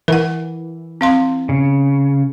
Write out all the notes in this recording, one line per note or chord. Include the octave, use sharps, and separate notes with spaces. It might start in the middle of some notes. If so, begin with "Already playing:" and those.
E3 A#4 F#5
C4 F5 C6
C#3